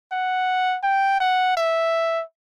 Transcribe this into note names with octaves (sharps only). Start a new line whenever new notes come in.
F#5
G5
F#5
E5